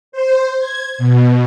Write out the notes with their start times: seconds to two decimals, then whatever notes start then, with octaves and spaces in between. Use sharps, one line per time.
0.12 C5
0.59 G#6
0.98 B2